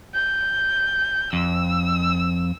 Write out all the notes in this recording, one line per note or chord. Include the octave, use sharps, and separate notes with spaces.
G6
F2 E6